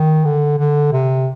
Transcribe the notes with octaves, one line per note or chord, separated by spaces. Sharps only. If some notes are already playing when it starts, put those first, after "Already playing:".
Already playing: D#3
D3
D3
C3